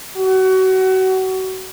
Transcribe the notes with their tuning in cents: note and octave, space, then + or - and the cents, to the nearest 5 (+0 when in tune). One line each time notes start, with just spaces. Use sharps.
F#4 +30